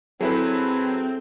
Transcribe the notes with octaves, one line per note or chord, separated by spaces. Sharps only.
F#3 C4 E4 G#4 A4 B4